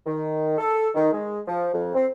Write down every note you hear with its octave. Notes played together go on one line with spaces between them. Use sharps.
D#3
A4
D#3
G#3
F3
F2
C4